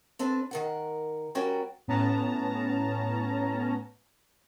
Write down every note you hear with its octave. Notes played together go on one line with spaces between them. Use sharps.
C4 D4 A4 B4
D#3 A#4 F#5
G3 C#4 F#4 A#4 G5
A2 B3 C#4 A5 A#5